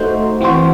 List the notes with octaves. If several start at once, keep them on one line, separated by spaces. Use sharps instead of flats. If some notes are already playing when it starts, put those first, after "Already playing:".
Already playing: A3 D#4 F#4 C5
E3 C4 F#4 C5